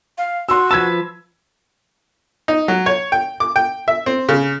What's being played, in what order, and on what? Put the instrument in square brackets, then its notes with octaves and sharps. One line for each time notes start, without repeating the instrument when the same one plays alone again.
[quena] F5
[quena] F#4 [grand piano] C6 E6
[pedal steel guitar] F3 B4 A5 [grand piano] E6 G#6
[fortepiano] D#4
F#3
C#5
G5
D6
G5
E5
C4
C#3